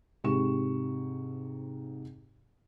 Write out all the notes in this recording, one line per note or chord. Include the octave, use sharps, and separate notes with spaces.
G#2 C3 G4 C#6 E7